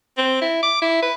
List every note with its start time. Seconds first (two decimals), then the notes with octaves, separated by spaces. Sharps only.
0.17 C4
0.42 E4
0.62 D6
0.82 E4
1.02 B4